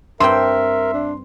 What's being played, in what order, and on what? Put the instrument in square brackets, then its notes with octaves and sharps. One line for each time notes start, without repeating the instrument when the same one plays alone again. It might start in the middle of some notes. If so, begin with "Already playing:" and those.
[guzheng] G2 C4 G5 [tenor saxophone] A#4 [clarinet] E5 [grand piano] C6
[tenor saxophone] D4